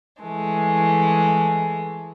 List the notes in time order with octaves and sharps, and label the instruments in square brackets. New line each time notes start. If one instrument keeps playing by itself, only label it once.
[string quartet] E3 G#3 A3